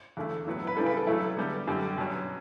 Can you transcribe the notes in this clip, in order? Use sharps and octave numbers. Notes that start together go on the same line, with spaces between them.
E2 D3 A3 E4
A2 F#3 B3 E4
B4
C#3 E3 G3 D4 A4
B4
A4
B2 F#3 A3 E4
D3 G3 B3
F#2 D3 G3 G4
B2 F#3 C#4